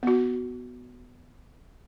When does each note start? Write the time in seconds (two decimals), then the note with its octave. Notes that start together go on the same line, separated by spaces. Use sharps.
0.03 B3 F#4